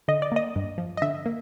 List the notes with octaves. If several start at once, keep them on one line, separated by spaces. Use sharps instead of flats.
D3 D#5
D5
A#3 D#5
G2
F3
D#5
D3 E5
A#3